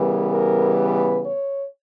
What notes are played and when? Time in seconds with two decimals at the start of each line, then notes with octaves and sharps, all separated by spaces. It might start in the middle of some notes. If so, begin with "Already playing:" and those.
Already playing: C#3 E3 G3 B3 A#4
0.30 A#4
0.76 B4
1.23 C#5